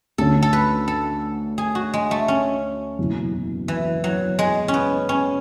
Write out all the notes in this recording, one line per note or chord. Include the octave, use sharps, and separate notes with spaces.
D2 D3 A3 C#4 A4
A4
B4
A4
G#4
F#4
G#3
A3
C#4
F#1 E2 B2
E3
F#3
G#3
C#4
B3
C#4